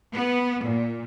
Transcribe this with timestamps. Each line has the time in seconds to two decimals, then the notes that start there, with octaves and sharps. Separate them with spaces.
0.13 B3
0.62 A#2